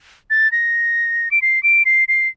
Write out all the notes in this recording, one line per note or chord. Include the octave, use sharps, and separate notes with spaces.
A6
A#6
D7
C7
D7
C7
C7